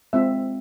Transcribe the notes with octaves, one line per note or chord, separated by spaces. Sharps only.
G#3 C4 F4 E5